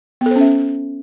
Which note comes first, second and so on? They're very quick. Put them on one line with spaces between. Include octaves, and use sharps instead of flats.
B3 A4 C5 C#4 E5